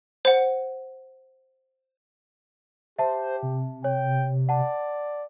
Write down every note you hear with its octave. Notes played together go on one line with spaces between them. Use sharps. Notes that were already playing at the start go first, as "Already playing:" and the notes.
C5 F#5
G4 C5 E5 A5
C3
C#5 G5
D5 F#5 A5